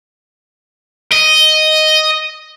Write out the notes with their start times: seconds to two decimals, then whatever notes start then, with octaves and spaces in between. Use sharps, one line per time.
1.12 D#5